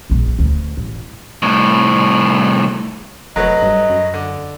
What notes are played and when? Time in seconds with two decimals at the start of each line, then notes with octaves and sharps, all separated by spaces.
0.10 A#1 A#2
0.39 D2
0.77 A1
1.43 C2 A2
3.36 F1 F#3 A3 B4 D#5
3.62 G2
3.89 F#2
4.14 D3